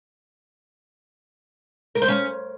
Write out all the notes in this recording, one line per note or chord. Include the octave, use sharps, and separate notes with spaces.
A#4
C5
C#4